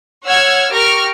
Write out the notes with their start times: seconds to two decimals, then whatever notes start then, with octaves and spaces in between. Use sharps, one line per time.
0.25 C#5 F#5 E6 F6 G#6
0.72 G4 A#4 C#6 F6 A#6 D7